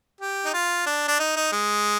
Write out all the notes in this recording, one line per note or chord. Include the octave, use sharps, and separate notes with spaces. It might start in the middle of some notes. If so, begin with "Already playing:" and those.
G4
D#4
F4
D4
D4
D#4
D#4
G#3